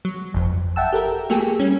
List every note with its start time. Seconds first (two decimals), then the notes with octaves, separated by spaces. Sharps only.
0.05 F#3
0.34 G1 F2
0.76 E5 F#5 G5 A5 E6
0.93 G4 A4 A#4
1.30 F#3 A3 A#3 G4 G#4
1.59 G3 C#4